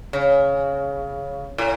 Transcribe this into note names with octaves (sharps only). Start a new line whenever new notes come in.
C#3
A2